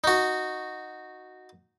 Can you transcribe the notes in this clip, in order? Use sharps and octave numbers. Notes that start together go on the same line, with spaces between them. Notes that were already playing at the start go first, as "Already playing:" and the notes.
D#4 F#4